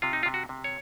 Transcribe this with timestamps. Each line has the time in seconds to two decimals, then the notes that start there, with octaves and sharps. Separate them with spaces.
0.02 C3 F4
0.13 D#4
0.23 F4
0.26 C3
0.34 F#4
0.49 C3
0.64 C#5